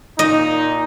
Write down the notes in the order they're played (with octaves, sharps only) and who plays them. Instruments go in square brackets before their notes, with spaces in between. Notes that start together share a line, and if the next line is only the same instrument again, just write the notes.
[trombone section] A#2 D#4 [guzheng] D#5